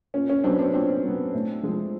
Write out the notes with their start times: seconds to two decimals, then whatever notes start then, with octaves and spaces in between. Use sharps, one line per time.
0.14 A#2 C#4
0.29 C#4
0.44 F#3 B3 C4 D4
0.59 C4 D4
0.74 A#2 C4 D4
1.03 F#3 B3
1.34 A2
1.63 F3 G#3